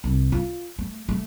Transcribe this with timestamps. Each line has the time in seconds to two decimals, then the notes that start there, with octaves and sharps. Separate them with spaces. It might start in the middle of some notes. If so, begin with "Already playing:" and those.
0.04 C2
0.32 F4
0.79 A3
1.09 A3